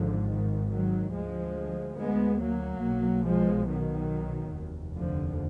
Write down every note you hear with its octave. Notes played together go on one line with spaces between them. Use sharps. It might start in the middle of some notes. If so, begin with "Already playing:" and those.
Already playing: G#1 G#2 D3 F3
D#3
D#3 F#3
D2 F3 G#3
G#3 B3
F#3 A#3
B1 B2
F3 G#3
D#3 F#3
F1 D#2
D3 F3